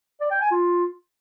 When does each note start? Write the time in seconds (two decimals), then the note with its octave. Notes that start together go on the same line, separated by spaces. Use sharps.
0.21 D5
0.31 G5
0.41 G#5
0.51 F4